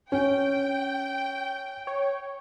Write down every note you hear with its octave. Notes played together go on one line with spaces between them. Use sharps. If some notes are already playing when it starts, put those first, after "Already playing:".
C#4 G5
C#5